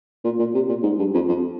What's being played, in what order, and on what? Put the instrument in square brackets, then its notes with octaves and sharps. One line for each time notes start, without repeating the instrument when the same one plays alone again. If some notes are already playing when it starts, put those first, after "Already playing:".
[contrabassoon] A#2
A#2
C3
A#2
G#2
G2
F2
F2